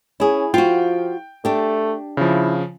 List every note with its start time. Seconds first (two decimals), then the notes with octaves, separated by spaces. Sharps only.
0.20 C#4 E4 G#4
0.54 F3 F4 F#4 G5
1.45 A3 D4 G4
2.17 C#3 F3 E4